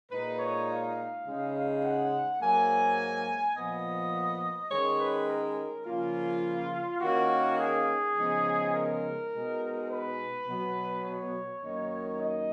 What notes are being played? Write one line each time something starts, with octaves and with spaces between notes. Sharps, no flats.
A#2 G#3 D#4 B4
C#5
F5
C#3 G#3 D#4
F#5
G#2 F#3 A#3 G#5
A#2 F3 B3 D#5
D#3 G#3 C#4 C#5
B4
A#4
C#3 F3 A#3 C#4 F4
D#3 A#3 C#4 F#4
G#4
C#3 F3 G#3 B3 D#4
A#4
B2 G#3 D#4
B4
B2 F#3 B3
C#5
F#2 D#3 A#3 D#4
D#5